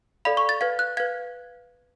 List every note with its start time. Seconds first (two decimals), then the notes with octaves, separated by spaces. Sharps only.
0.25 A4 D5 F5 B5
0.37 C#6
0.49 A6
0.61 B4 F5 G#6
0.79 F#6
0.97 B4 F5 G#6